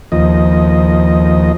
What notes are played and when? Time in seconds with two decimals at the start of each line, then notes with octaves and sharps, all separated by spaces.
0.12 D#2 F3 D#5